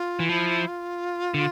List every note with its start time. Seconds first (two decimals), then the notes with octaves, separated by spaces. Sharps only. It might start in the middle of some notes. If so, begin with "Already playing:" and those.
Already playing: F4
0.19 E3
0.29 F3 E4
0.68 F4
1.34 D3